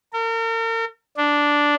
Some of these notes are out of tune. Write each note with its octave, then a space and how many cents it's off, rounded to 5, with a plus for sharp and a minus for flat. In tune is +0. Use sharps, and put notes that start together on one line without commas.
A#4 -40
D4 -5